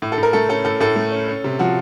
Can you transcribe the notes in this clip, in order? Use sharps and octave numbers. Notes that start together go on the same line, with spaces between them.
A2
A4
A2
A#4
A3 A4
C#4 A4
A2 A4
A2 A4
A3
C#4
C#4
C3
F3 F#4